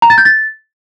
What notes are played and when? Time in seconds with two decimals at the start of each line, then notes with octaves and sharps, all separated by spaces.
0.02 A#5
0.10 A6
0.18 G6
0.25 A6